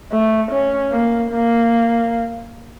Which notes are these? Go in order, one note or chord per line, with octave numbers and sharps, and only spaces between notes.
A3
C#4
A#3
A#3